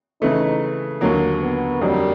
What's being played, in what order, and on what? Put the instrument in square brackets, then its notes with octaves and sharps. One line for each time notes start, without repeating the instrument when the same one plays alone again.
[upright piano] C#3 E3 A3 [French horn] D#4
[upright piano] D#2 D3 F#3 A#3
[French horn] B3
[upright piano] F2 D3 F#3 A#3 D#4 [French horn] G3